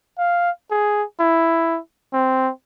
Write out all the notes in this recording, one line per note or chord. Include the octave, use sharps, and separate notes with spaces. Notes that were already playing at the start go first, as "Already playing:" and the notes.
F5
G#4
E4
C4